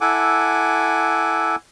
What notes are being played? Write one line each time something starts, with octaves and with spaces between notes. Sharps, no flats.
E4 A4 F#5 G#5 D6